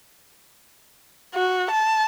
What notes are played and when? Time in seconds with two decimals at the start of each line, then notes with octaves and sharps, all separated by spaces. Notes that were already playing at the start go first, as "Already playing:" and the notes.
1.34 F#4
1.71 A5